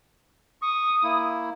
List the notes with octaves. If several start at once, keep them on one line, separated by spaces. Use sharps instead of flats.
C#6 D#6
A#3 E4